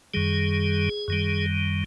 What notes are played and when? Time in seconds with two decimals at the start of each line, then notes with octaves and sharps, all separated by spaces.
0.14 F#2 D#3 G3 G#4
1.08 F#2 D#3 G3